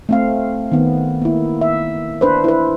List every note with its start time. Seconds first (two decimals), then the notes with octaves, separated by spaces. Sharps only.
0.09 A3 C4 F5
0.72 D#3 B3
1.22 A#3 E4
1.61 E5
2.21 D4 B4 C5
2.44 E4 B4